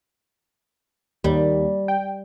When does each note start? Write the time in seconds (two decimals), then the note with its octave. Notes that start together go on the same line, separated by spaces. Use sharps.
1.24 D#2 G3
1.88 G5